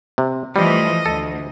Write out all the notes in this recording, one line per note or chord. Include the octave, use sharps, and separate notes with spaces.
C3
E3 F3 G3 A3 D#5
D2 A4